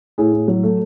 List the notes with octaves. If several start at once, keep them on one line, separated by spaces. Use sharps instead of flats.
A2 G#4
A2
F#3
A3